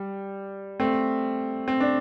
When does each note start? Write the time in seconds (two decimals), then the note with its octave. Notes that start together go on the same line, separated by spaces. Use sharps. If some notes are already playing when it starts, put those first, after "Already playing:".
Already playing: G3
0.79 A3 C4
1.68 C4
1.80 D4